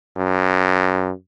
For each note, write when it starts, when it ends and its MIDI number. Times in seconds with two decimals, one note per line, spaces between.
0.16 1.11 42